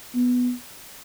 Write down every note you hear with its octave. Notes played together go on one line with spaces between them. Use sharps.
B3